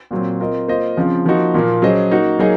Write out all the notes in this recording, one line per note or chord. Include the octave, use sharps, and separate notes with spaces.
A#2 F#3 C4
C4 F4 A#4 D#5
A#3 F4 C5 D#5
C#3 F3 C4 F4
F3 A#3 D#4 F#4
A#2 F3 A#3
F#3 C#4 G#4 C5 D#5
A#3 D#4 F#4
F#3 A#3 D#4 G#4 D#5